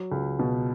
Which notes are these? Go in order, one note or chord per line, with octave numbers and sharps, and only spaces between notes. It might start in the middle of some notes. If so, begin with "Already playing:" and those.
Already playing: F#3
C#2
B2